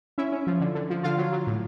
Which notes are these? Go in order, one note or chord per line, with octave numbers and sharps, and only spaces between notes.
C#4 E4 E5
C#4
F3
D3
D3
F3
D3 F4 F5
F#3
F#3
A2